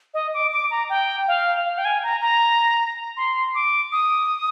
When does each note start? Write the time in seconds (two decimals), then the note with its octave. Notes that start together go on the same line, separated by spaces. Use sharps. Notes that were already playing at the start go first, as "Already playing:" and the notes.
0.14 D#5
0.34 D6
0.53 D6
0.71 A#5
0.90 G5
1.28 F5
1.65 F5
1.78 G5
1.85 G#5
2.03 A#5
2.22 A#5
3.17 C6
3.55 D6
3.92 D#6